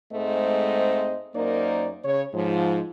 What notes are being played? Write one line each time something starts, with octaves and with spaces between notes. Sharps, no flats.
G#2 G#3 A3 C4 C5 D#5
F#2 A#3 D#4 A#4 C5 D5
C#3 C#5
G#2 F3